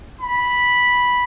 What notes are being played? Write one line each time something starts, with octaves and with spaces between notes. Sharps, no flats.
B5